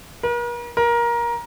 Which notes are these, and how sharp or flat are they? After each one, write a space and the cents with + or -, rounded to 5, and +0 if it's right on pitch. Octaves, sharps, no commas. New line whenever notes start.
A#4 +45
A#4 +20